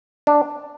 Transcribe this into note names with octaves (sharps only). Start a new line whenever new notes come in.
D4